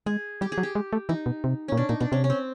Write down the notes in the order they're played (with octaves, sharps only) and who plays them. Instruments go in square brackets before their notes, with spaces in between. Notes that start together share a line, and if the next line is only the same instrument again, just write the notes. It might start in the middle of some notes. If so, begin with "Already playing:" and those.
[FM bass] G#3 [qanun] G#4
[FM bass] G3 [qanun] G4
[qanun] G#4
[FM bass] F#3
[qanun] G4
[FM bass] G#3
A3
[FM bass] E3 [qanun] D#4
[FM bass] B2
C3
[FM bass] A#2 [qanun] C#4
[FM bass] B2 [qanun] D4
[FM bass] A#2 [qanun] D#4
[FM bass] B2 [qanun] D4
[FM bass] C3 [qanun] C#4
[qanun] C#4
C4